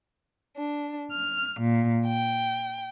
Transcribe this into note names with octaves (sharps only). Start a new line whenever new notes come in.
D4
F6
A#2
G5